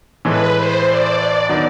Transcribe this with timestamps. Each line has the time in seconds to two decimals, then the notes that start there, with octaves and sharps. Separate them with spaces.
0.25 A2 E3 G#3 B4
0.56 C5
0.87 D5
1.49 D#3 F#3 B3 D4